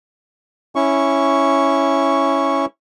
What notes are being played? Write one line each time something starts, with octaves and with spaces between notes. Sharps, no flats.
C#4 E4 C#6